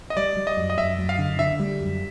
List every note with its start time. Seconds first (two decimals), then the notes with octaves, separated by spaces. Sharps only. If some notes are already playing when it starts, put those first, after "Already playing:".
0.10 D#5
0.16 G3 D5
0.36 G3
0.47 D#5
0.57 F#2
0.70 D#5
0.77 F#2 E5
0.98 F#2
1.09 F5
1.18 D3
1.39 D3 E5
1.59 G3
1.80 F#2